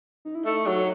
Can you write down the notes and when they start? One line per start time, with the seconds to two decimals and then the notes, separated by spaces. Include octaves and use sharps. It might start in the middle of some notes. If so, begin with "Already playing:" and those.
0.25 D#4
0.35 E4
0.44 A3 D#4
0.67 F#3